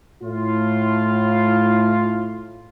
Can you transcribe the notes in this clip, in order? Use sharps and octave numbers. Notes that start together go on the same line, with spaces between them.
A2 F4